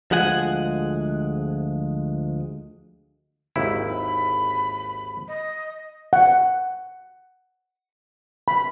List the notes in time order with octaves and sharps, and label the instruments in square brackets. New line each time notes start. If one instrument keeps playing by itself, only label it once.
[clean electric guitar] D2 F3 G#3 F#5 G#5
[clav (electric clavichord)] G#1 D#2 E4
[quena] B5
D#5
[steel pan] F#5
B5